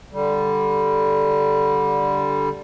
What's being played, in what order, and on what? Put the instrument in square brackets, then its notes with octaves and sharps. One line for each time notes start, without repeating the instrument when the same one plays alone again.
[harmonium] D3 G3